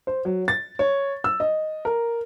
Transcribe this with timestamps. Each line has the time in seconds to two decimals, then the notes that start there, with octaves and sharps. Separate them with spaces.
0.07 C5
0.25 F#3
0.48 A6
0.79 C#5
1.24 E6
1.40 D#5
1.85 A#4